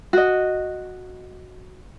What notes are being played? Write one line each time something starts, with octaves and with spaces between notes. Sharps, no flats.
F#4 D#5